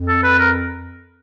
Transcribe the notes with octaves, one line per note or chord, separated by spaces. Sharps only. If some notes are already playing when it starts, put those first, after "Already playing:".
Already playing: F2
A4
B4
A#4